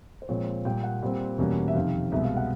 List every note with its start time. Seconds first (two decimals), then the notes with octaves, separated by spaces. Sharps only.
0.22 C5
0.29 A#2 F3 G#3 C4 C#5
0.65 A#2 G3 A#3 G5
0.84 F#5
1.03 A#2 G3 C4
1.38 E2 B2 G3 A#3 C#4
1.68 E5
1.75 F2 C3 D#3 F5
2.12 C2 B2 G#3 B3 E5
2.24 F5
2.37 F#5